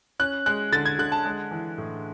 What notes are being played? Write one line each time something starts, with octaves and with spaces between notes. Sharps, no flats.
C#4 F#6
G#3 F#6
D3 A6
G#6
D3 F#6
A5
G#3
E3
A2